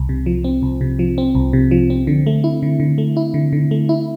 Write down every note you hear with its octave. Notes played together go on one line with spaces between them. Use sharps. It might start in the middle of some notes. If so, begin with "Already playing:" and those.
Already playing: C2
C3
F3
C4
C2
C3
F3
C4
C2
C3
F3
C4
D3
A3
E4
D3
D3
A3
E4
D3
D3
A3
E4